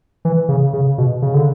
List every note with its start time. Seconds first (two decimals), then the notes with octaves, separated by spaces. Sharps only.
0.25 E3
0.49 C#3
0.73 C#3
0.98 B2
1.22 C#3
1.34 D3